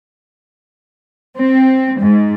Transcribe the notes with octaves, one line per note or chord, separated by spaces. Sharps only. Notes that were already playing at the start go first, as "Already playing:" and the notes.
C4
G#2